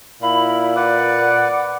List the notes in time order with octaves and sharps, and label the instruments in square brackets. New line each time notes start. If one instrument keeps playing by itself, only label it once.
[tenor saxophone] A#2 [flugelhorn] E4 [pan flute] B5
[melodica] B4 [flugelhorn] D5 [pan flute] F#5